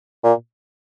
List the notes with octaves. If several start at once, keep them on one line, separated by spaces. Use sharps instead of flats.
A#2